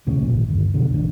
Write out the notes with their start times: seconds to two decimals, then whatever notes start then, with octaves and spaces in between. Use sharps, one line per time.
0.07 D#2 A2 C#3
0.19 B1 A#2
0.34 G#1
0.48 G1 D#2
0.74 B1 F2 B2 D3
0.92 D#1 A1 D4